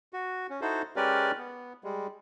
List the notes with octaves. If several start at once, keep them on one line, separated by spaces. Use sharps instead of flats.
F#4
C#4
D#4 E4 F#4 A4 C5
G#3 C#4 G4 A#4 B4 D5
B3
G3 G#3